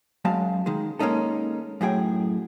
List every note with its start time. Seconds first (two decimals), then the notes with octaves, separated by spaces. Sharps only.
0.25 F#2 G#3 F5 A5
0.66 D#3 G#3
0.99 G#3 A#3 C#4 D#4 A4
1.81 F#2 A2 G#4 G5